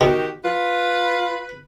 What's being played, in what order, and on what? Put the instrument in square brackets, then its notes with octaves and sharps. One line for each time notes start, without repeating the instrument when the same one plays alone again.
[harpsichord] B2 [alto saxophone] D#3 [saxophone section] F#4 G4
[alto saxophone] F4 [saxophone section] B4